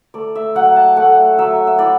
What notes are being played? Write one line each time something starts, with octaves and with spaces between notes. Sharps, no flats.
A3 D5
E5
F#3 F#5
A5
A3 F#5
F#3 E5
E5
E4 D5